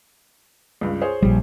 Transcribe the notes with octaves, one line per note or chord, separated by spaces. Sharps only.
C#2 G2
G#4 C5 C#5
A#1 G3